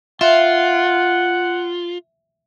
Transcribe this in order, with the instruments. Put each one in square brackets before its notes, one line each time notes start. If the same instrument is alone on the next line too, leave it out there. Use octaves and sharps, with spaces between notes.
[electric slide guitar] F4 [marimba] E5 [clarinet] F#5